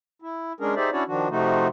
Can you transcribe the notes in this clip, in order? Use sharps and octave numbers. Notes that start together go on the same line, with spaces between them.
E4
G#3 C#4 D4 G#4 A#4
D#4 G4 G#4 C5 D5 E5
C#4 D4 E4 F#4 C#5 D5
D#3 F3 D4 F#4
C3 F3 A3 D#4 F#4